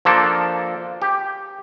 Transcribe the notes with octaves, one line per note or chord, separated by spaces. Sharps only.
F3 A#3 D4 A4
G4